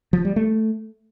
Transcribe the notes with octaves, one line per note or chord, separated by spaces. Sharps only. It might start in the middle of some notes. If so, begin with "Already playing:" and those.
F3
G3
A3